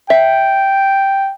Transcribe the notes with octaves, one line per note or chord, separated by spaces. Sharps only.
E5 G5